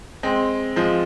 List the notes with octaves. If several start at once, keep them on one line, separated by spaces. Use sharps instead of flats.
G#3 C4
F3 G#3